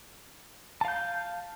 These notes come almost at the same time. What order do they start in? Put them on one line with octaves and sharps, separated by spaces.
A5 F5 G6